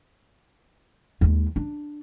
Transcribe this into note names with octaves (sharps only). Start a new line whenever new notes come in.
D#2 G#3
D4